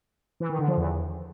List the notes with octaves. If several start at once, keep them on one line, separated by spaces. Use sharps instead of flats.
E3
D#3
D3
F3
E2